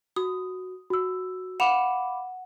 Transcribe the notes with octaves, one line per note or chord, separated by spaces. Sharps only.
F#4 D#6
F#4 E6
F5 F#5 B5 D6 E7 F7